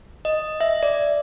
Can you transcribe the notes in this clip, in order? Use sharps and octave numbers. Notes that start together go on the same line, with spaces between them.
D#5
E5
D5